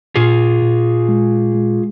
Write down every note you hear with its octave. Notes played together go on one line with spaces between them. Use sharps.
A#2 F4 G#4
A#2
G#3
G#3